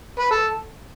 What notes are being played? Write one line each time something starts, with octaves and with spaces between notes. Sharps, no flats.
B4
A4